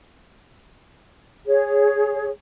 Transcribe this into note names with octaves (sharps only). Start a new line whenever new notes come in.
G#4 C#5